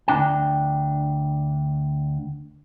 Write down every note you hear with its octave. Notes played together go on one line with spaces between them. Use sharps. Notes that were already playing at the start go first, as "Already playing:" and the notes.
D2 C3 D4 G5